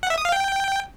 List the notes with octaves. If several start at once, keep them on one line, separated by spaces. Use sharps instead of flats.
F#5
E5
D#6
F5
G5